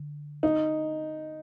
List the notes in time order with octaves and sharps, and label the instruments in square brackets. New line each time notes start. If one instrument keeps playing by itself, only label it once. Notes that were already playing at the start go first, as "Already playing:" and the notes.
Already playing: [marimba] D3
[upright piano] D#4